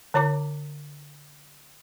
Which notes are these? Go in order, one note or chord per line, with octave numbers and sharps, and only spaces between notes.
D3 C#5 A#5 D6